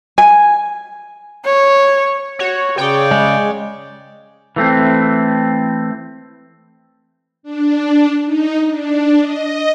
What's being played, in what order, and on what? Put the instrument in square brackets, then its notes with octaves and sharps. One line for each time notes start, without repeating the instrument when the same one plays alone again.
[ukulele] G#5
[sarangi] C#5
[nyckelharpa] F#4 [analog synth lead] C#5
[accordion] C#3 [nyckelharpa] C#5 D5 [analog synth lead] G5
[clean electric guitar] G#3
[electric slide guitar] E3 A3 C4
[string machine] D4
D#4
D4
D#5